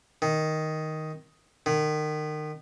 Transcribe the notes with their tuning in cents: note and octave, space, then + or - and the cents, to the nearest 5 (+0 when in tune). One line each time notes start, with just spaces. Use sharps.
D#3 +5
D#3 -30